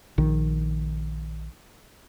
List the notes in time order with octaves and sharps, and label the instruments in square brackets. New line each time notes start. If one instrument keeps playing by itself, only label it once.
[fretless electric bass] A#1 D#3